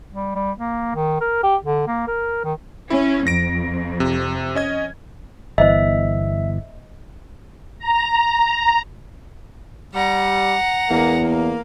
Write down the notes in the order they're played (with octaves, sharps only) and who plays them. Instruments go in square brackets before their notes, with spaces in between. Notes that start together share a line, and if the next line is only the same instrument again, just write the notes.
[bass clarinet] G3
G3
A#3
D#3
A#4
G4
D3
A#3
A#4
D#3
[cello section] C#4 [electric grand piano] E4
[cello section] F2 [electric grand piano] A#6 D7
[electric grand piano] C3
C#4 D#5 G#6
[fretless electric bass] G1 E3 B3 [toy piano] C5 D#5 [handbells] E5
[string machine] A#5
[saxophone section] G3 [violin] F#5 A#5
[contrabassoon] E2 [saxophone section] G#3 A#3
[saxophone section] A#3